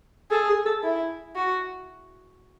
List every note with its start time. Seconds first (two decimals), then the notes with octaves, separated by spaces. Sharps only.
0.31 G#4 A4
0.49 G#4
0.66 A4
0.83 E4
1.36 F#4